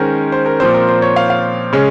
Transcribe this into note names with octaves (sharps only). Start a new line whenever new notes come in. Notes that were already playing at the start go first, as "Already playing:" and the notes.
Already playing: D#3 G#3 C#4 A#4 C5
C5
A#4
A#2 F3 C4 C5
A#4
C5
C#5
F5
F5
C#3 G#3 C#4